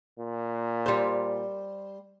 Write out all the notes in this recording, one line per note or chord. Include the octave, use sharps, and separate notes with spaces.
A#2
G3 C5